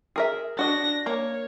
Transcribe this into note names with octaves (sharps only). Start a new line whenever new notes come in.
G#4 A#4 E5
D4 F#4 D#5 A#6
A#3 C#5 A#5